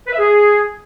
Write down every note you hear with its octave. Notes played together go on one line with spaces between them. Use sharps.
B4
E5
G#4